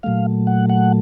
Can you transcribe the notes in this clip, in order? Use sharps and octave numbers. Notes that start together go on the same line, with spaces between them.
A#2 F#3 A3 F5
F#5
F#5